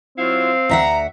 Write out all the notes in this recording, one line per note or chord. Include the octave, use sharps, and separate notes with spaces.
F#3 C4 E4 F4 F5
D2 E5 F#5 A#5